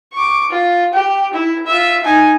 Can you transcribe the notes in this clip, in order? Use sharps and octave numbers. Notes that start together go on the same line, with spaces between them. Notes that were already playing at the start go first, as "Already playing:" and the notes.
C#6 D6
F4
G4
E4
F4 E5
D#4 G#5